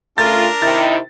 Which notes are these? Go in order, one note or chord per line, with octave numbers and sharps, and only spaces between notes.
C#3 A3 C#4 D4 F4 A#4 A6
C3 D#3 E4 A6